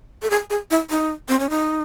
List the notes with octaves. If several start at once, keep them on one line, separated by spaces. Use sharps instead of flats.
A4
G#4
G#4
E4
D#4
C4
C#4
D#4